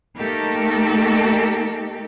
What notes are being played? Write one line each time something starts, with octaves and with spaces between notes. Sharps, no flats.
A3 A#3 D#4 G4 A4 A#4